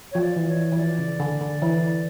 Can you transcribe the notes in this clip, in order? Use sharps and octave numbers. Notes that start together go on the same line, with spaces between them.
F3 C#5
D5
E3
C#5
E3
E3
F3 D5
C#3
D3
D3
E3